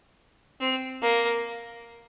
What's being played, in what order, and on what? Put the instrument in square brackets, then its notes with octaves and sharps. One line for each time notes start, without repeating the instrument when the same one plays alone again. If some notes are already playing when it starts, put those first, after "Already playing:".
[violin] C4
A#3